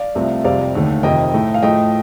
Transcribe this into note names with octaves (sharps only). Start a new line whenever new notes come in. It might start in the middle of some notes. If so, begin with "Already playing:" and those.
Already playing: D5 F5
C2 C3 F3 A3
F2 C3 G3 D5 F5
D#2 D3 A3
F2 C3 D#3 D#5 G5
A2 A3
F5
A2 F3 A3 D#5 G5